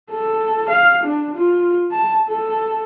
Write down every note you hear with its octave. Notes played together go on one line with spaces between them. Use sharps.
A4
F5
D4
F4
A5
A4